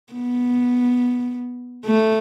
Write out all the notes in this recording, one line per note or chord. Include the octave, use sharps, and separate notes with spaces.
B3
A3